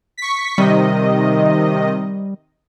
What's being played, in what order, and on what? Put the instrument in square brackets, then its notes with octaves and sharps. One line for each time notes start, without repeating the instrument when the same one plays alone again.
[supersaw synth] C#6 B6
[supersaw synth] C3 D#3 D#5 [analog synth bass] G3